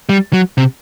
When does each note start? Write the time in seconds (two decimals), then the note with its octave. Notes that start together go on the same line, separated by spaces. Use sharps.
0.09 G3
0.33 F#3
0.57 C3